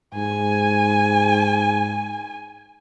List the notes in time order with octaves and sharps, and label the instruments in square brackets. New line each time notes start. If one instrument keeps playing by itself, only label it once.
[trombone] G#2 [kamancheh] G#5